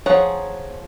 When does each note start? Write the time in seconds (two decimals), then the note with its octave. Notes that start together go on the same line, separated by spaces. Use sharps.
0.06 F3 G#4 C#5 F#5 A#5